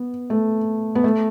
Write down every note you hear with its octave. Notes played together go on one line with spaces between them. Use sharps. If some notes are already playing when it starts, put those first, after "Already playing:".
Already playing: B3
A3
B3
A3